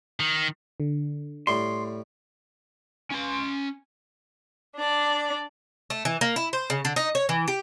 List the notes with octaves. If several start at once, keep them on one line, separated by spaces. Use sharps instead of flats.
D#3
D3
A2 G3 C6
C#4 C6
D4 D5
A3
E3
A#3
E4
C5
C#3
D3
D#4
C#5
E3
G4